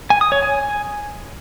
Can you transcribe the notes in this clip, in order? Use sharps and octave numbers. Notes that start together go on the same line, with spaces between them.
G#5
D#6
C#5
G#5